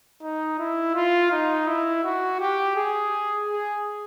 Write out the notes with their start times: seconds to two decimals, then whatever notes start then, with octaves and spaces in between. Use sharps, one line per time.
0.22 D#4
0.59 E4
0.95 F4
1.32 D#4
1.67 E4
2.04 F#4
2.40 G4
2.77 G#4
3.49 G#4